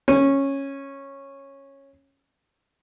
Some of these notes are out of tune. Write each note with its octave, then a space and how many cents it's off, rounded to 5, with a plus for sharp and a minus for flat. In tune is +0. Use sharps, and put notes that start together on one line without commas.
C#4 -10